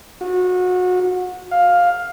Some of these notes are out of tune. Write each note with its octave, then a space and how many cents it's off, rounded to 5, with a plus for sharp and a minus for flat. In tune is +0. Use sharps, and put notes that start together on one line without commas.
F#4 -30
F5 +10